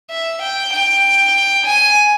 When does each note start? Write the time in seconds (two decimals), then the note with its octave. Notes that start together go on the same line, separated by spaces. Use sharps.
0.10 E5
0.42 G5
0.73 G5
1.66 G#5